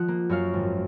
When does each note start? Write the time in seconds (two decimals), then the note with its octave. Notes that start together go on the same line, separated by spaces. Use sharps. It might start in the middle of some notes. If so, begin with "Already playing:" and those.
Already playing: F3 D#5 F#5
0.08 A#3
0.29 F#2 C#5 F5
0.54 G#1